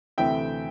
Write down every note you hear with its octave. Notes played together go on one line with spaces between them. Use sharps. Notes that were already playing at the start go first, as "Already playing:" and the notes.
D2 C3 E3 A3 C4 E5 G5